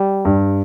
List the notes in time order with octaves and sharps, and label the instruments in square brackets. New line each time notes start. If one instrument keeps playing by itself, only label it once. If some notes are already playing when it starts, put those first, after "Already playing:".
Already playing: [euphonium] G3
[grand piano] G2